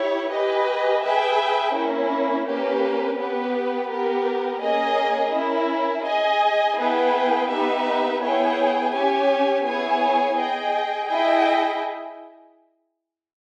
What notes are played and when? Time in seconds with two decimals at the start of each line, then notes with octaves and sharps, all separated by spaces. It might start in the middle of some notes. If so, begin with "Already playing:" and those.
Already playing: E4 G4 C#5
0.31 G4 B4 D#5 G#5
1.03 G#4 B4 E5 G5
1.75 A#3 C#4 E4
2.47 A#3 C#4 G4 B4
3.19 B3 G4 B4
3.91 B3 G4 A#4
4.63 A#3 C#4 G#4 D#5
5.34 C#4 E4 A#4
6.07 G#4 D#5 G#5
6.78 B3 E4 G#4 B4 G5
7.51 B3 D#4 G4 B4 E5
8.22 B3 E4 G#4 C#5 G5
8.94 C#4 G4 C#5 G#5
9.66 B3 E4 G#4 C#5 G#5
10.38 G#4 D#5 G5
11.10 E4 G#4 D#5 G5